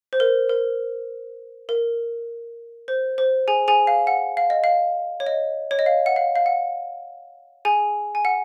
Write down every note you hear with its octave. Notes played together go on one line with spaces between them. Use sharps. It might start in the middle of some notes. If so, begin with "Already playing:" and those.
C5
A#4
A#4
A#4
C5
C5
G#4 G#5
G#4 G#5
F5
F#5
F5
D#5
F5
C#5
D#5
C#5
D#5
F5
F#5
F5
F5
F#5
G#4 G#5
G#5
F#5